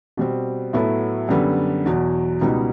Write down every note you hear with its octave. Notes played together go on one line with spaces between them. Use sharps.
B2 G3 C4
A2 F#3 B3 E4 A4
F#2 D3 G3 B3
E2 B2 F#3
C#2 B2 G3 B3 D#4